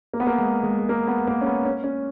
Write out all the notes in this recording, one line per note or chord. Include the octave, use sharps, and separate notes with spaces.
A#3
B3
A#3
G#3
G#3
G#3
A#3
B3
A#3
C#4
B3
C#4
C#4